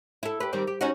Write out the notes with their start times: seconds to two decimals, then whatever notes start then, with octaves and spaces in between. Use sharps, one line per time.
0.23 E4 A4
0.40 G4 B4
0.53 D#3 G3 C4
0.67 G4
0.81 C#4 D#4 F#4